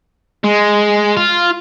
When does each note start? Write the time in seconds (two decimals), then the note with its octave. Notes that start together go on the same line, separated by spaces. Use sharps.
0.44 G#3
1.17 F4